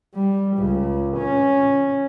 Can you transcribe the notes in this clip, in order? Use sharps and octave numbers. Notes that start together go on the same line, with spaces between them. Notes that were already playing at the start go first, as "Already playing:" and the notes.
G3
C#2
C#4